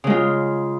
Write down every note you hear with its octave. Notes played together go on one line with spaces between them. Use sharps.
C#3 G#3 F4